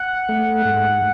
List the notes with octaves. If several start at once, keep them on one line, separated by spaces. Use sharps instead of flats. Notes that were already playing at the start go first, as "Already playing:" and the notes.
Already playing: F#5
A3
G#2